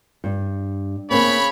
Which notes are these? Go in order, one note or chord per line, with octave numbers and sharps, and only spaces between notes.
G2
C#3 A#3 C4 C#5 B5